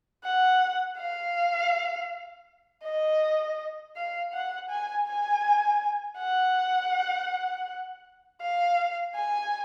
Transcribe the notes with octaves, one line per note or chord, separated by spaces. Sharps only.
F#5
F5
D#5
F5
F#5
G#5
G#5
F#5
F5
G#5